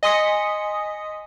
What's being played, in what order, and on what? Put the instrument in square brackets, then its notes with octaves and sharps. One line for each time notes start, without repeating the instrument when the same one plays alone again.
[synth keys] D#5 G#5 C6 D#6 B6 C#7